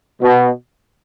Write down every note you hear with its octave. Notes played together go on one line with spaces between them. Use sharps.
B2